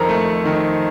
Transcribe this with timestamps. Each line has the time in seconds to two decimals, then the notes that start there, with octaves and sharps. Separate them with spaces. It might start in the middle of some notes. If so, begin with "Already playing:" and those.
Already playing: F2 D#3 C4 A4 A#4 A#5
0.09 A3
0.45 D#3